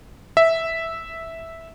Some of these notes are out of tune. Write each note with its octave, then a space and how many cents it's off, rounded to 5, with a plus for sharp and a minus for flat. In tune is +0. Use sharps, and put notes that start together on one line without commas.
E5 -5